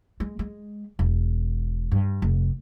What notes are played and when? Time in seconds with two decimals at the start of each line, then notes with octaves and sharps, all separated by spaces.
0.20 G#3
0.39 G#3
0.99 E1
1.92 G2
2.22 F1